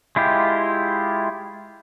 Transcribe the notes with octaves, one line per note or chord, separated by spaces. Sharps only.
G#3 E4 F4 G4